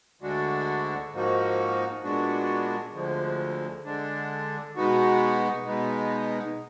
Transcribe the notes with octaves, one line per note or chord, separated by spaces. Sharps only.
D2 D3 G#3 D4 F#4
G#2 F3 A#3 D#4 F#4
A#2 G#3 B3 D4 F#4
D2 D3 F3 G#3
D3 G#3 D4
B2 G#3 B3 D#4 F#4
B2 G#3 B3 D#4